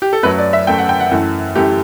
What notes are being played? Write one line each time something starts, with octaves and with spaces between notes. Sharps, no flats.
G4
A4
F#2 F#3 A3 B4
D5
E5
F#2 F#3 A3 G5
F#5
G5
F#5
F#2 E3 A3
F#2 E3 A3 G4